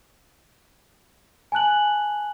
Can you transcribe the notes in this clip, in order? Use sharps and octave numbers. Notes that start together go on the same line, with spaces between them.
G#5 A5 F#6 F#7